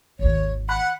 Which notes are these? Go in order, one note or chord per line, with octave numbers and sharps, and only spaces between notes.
G#1 D#2 C#5
F#5 B5 F#6